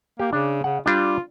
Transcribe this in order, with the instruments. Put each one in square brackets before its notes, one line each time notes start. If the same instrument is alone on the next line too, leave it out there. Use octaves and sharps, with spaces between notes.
[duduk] A#3 [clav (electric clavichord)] G4
[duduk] C#3 [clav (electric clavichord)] D4
[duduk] C#3 [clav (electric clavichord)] F#5
[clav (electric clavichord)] G3 D4 [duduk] F4